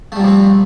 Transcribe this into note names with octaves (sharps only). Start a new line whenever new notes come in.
A#2 F3 G3 A3 C4